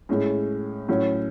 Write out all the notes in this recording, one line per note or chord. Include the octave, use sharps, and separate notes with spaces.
A2 G#3 C#4
A2 F#3 C#4